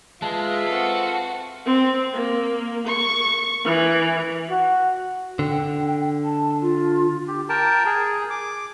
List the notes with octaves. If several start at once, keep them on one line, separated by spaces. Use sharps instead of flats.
G#3 F4 B4 E5 A5
C4 F#4 A4
C4
A#3
C#6
E3
F#4
D3 G5
A5
F4
G4
A#4 G5 A5
G#4
D6